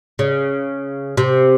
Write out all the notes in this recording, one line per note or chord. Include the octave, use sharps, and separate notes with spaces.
C#3
C3